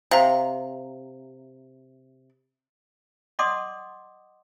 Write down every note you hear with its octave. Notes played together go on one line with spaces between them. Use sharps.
C3 F5 A#5
D5 D#5 F#5 C6 D6 D#6